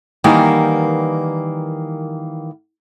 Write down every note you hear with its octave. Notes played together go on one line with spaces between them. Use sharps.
D#3 E3 G3 A#3 B3